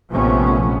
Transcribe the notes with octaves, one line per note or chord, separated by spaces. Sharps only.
A#1 C3 F3 A3 B3 C#4